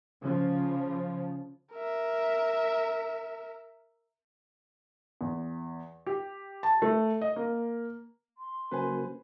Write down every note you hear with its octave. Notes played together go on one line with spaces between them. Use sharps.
C#3 F3
A#4 E5
E2
G4
A5
A3
D#5
A#3
C6
C#3 F#3 A#3 B4 C5 G#5